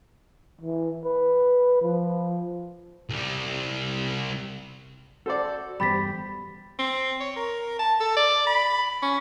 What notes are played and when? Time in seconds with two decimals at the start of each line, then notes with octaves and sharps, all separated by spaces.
0.61 E3
1.04 B4
1.82 F3
3.09 C2 G3
5.26 F#4 A4 C5 D5
5.80 E2 G2 G4 C5 B5 A6 B6
6.79 C4
7.20 C#5
7.36 A#4
7.79 A5
8.00 A4
8.16 D5
8.47 B5
9.02 C#4